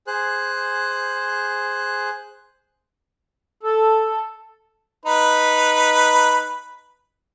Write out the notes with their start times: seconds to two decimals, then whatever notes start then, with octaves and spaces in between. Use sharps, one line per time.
0.07 G#4 C5 F#6
3.63 A4
5.06 D#4 B4